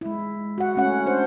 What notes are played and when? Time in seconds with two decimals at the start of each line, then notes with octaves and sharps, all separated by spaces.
0.01 G#3 E4
0.58 F#4 F#5
0.76 A3 C#4 F#5
1.06 D4 C5